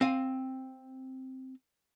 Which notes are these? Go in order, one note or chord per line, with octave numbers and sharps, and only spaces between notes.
C4 F5 G#5